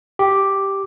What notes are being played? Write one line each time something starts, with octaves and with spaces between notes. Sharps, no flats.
G4